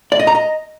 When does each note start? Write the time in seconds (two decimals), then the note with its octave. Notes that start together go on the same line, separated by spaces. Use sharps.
0.12 D5
0.20 D#5
0.27 A#5
0.35 D#5